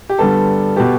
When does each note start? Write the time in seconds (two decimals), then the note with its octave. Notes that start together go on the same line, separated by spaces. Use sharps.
0.09 G4
0.19 G2 D3 G3 B3 A4
0.76 B2 B3 G4